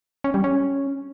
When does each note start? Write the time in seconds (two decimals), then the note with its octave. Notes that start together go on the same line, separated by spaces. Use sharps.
0.24 C#4
0.34 G3
0.44 C#4